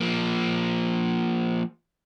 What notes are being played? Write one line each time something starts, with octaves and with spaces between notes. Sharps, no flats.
F3 A#3